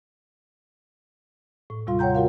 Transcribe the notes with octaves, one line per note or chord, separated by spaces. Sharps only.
A2
D#2 C3 G3 F4 F5 C6
C#5 F#5 G5 A#5 G6
F4 F#4 A#4 F5